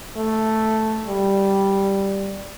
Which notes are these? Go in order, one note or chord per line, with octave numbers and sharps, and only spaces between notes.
A3
G3